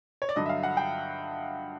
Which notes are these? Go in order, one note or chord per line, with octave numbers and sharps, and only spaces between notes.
C#5
D5
G2 D3 F#3 D#5
E5
F5
F#5
G5